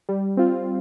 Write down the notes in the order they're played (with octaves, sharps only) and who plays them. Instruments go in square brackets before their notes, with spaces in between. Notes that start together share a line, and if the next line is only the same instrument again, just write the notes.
[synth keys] G3
C4 F4